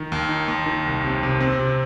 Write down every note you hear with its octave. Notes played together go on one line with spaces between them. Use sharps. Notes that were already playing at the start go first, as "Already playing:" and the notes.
Already playing: D#3
D#2
D#4
D#2
D#3
C2
C3
C3
C4
C3